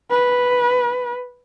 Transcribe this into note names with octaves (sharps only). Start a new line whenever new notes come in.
B4